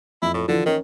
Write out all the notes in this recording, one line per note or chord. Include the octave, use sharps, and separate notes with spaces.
F2 E4
A2
D3 E3 F3
D#3 C#4 A#4